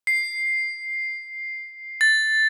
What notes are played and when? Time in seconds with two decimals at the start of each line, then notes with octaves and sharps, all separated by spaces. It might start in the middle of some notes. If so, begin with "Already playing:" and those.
0.07 C7
2.01 A6